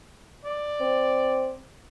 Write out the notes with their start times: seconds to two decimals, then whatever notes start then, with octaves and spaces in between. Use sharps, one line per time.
0.45 D5
0.80 C4